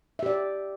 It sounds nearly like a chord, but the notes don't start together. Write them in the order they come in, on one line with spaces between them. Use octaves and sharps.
E5 G4 D5